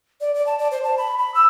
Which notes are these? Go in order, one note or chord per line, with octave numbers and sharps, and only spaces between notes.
D5
D5
A5
D5
C5
A5
B5
B5
E6